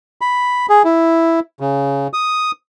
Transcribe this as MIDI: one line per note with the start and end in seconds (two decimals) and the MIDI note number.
0.21 0.66 83
0.70 0.83 68
0.85 1.40 64
1.60 2.07 49
2.13 2.51 87